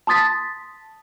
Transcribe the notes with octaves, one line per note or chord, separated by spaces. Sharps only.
A5 C6 D#6 A6 B6